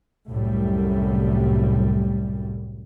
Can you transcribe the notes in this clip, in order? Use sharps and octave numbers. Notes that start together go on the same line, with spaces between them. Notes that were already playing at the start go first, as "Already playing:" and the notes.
C2 F#2 A2 G3